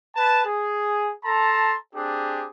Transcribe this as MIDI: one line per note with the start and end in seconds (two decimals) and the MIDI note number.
0.16 0.44 71
0.16 0.44 81
0.45 1.12 68
1.25 1.74 69
1.25 1.74 81
1.25 1.74 82
1.25 1.74 84
1.95 2.47 60
1.95 2.47 62
1.95 2.47 67
1.95 2.47 68